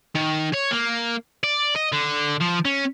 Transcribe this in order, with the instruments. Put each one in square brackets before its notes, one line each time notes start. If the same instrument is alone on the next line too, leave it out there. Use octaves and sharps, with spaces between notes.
[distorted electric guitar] D#3
C#5
A#3
D5
D#5
D3
F3
C#4